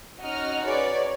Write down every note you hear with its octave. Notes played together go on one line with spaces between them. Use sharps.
C#4 D#4 F#4 D#5 F6
G#4 B4 C#5 D5